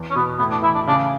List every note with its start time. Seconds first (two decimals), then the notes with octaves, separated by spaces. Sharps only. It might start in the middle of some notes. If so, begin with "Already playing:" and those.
Already playing: E2
0.10 C#4
0.15 B2 B3
0.39 A2 B3
0.51 D4
0.62 E3 E4
0.75 D4
0.87 C#3 D4